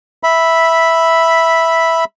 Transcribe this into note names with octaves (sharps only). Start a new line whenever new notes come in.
E5 B5